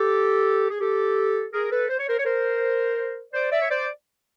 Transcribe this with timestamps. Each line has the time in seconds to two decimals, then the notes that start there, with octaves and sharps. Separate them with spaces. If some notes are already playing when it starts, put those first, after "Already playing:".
Already playing: G4 A4
0.70 G#4
0.80 G4 A4
1.53 G#4 A#4
1.71 A4 B4
1.89 C5
1.99 C#5
2.08 A#4 C5
2.18 C#5
2.25 A#4 C5
3.34 C5 D5
3.51 D5 E5
3.62 C#5
3.70 C5 D5